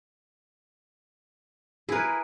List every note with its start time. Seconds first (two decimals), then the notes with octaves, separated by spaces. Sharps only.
1.89 E4 G#4 A#4 B4